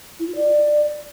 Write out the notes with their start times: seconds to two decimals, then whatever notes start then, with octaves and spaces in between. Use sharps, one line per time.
0.19 E4
0.27 F4
0.35 D5